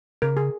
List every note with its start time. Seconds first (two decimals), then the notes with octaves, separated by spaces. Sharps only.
0.22 C#3 A#4
0.37 G#4